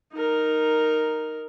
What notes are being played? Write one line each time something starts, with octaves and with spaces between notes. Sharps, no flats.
D#4 A#4